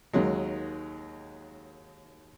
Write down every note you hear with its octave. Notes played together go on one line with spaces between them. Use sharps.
D#2 D#3 F#3 G#3